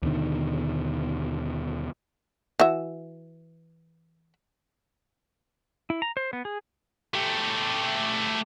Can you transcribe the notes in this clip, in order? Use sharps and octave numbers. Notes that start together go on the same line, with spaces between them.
D#2 B2 D3 D#3
E3 F#4 E5
E4
A#5
C5
B3
G#4
A3 G4